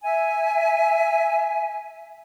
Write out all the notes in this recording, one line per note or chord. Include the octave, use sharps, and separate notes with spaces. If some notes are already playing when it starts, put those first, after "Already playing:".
E5 G#5